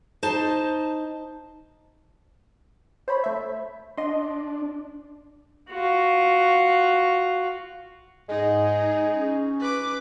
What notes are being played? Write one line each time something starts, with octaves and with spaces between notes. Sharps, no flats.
D#4 C5 A5
C5 C#5 B5
A3 E5
D4 D#5 C6
F4 F#4
G#2 G#3 D#4 G#4
C#4
B4 D6